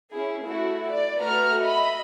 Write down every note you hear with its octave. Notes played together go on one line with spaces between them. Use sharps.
C#4 E4 G#4
A3 E4 F#4
D5
A3 F#4 B4 A#5 F6
D#5 E5 B5